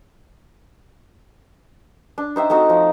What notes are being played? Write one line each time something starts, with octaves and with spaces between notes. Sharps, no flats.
D4
D#4 C5 E5 G5
A3 C4 D#4 F#4
F3